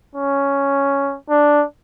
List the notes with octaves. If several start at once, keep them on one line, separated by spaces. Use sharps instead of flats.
C#4
D4